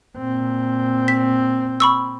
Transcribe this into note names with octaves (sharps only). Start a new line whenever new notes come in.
A#2 C4
B6
B5 C#6 E6